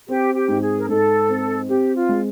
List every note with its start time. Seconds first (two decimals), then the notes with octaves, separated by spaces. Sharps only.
0.08 C4 G4
0.35 G4
0.48 G#2
0.61 G#4
0.79 A#4
0.89 G#2 A4
1.29 C4
1.69 C4 G4
1.96 F4
2.09 G#3